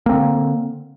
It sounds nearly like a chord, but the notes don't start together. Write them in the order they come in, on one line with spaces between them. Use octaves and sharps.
A#3 C4 D3